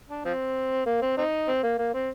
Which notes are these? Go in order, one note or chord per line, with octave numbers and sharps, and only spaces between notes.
D4
F3 C4
A#3
C4
C4 D#4
C4
A#3
A#3
C4